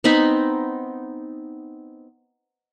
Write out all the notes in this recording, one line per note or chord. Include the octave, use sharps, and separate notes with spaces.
B3 C4 D#4 B5